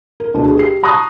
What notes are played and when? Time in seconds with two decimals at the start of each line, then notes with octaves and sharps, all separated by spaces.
0.20 A#4
0.34 D2 B2 D4
0.46 G#4
0.57 G4 C7
0.83 A5 A#5 C#6 D#6 F#6 A#6